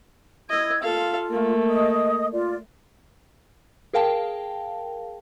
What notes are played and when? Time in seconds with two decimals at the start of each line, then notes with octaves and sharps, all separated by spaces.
0.50 E4 D#5 E6 G#6
0.83 F4 A4 F5
1.30 A3 A#3
1.69 D#5 D#6
2.33 F4 D5
3.93 G#4 A#4 F5 G5 A5